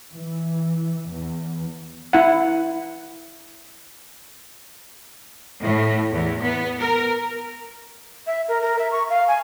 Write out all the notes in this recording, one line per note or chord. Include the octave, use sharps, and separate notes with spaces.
E3
E2
E4 F#5
A2
E2
B3
A#4
E5
A#4
A#4
E5
C#6
F5
G#5